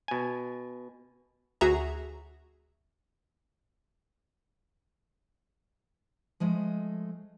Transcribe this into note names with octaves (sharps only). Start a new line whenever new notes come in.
B2 G#5
D2 F#4 G#4 E5 A#5
F3 G#3 A3 D#5